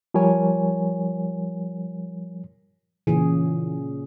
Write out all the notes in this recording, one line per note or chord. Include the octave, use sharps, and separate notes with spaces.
F3 G3 A#4 C#5 G#5
A#2 C#3 E3 G#4